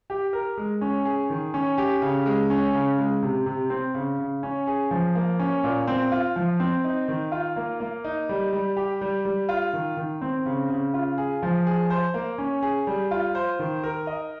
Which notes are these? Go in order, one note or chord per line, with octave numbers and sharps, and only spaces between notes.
G4
A#4
G#3
C#4
G#4
D#3
C#4
G4
C#3
G#3
C#4
C#3
G#3
C3
C3
C4
C#3
C#3
C#4
G#4
F3
A#3
C#4
A#2
C4
F4
F3
C4
D#4
D#3
F4
A#3
A#3
D#4
G3
G3
G4
G3
G3
F4
D#3
D#3
C4
C#3
C#3
F4
G#4
F3
G#4
C5
A#3
C#4
G#4
G3
F4
C5
D#3
A#4
D#5